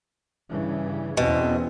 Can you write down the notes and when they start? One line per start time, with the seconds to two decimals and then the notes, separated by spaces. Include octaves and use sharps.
0.48 G2 C#3 E3
1.17 E2 B2 C4 C#4